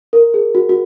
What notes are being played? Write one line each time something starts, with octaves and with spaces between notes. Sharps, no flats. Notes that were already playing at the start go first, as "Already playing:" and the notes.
A#4
G#4
F#4
F#4